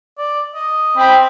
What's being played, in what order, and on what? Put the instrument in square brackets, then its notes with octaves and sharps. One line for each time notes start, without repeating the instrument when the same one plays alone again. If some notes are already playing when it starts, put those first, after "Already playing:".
[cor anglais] D5
D#5
[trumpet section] C4 B5